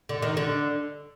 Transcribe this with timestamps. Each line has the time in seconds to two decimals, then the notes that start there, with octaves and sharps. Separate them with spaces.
0.09 D3
0.22 D#3
0.37 D3